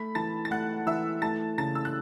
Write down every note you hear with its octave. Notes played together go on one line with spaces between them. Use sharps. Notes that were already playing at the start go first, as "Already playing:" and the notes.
Already playing: A3 B5 B6
E3 A5 A6
A6
A3 F#5 F#6
E3 E5 E6
A3 A5 A6
C#3 A5 A6
E6
F#6